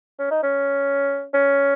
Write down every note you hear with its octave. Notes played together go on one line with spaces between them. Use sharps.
C#4
D#4
C#4
C#4